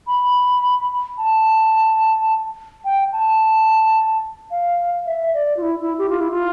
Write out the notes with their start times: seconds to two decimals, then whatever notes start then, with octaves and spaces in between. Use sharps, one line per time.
0.07 B5
1.18 A5
2.85 G5
3.13 A5
4.51 F5
5.06 E5
5.34 D5
5.57 F4
5.62 E4
5.80 E4
5.98 G4
6.09 F4
6.20 E4
6.30 F4